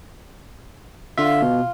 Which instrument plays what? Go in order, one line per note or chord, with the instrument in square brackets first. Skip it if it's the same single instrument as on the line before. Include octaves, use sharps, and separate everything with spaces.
[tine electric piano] D3 E5 [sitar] F4
[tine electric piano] B2